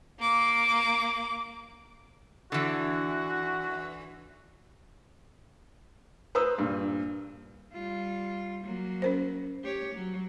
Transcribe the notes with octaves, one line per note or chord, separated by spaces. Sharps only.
A#3 D6
D3 E3 F#4
B4 C5 A#5 D#6 E6
G2 A#2
G3 F4
F#3 A#3
C#4 A#4 C5
G4 C#5
F#3